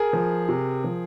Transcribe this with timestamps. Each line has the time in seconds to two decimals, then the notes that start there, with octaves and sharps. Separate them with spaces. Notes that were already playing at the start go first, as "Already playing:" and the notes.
Already playing: G#4 A#4
0.13 F3
0.49 C3
0.84 F3